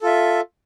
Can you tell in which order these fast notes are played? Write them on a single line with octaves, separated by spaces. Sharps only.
A4 F4 E5